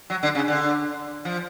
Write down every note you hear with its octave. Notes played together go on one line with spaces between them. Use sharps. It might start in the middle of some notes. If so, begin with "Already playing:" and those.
F#3
D3
C#3
D3
F3